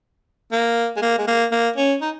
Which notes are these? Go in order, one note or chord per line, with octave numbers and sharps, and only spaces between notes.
A#3
G#3
A#3
G#3
A#3
A#3
C#4
D#4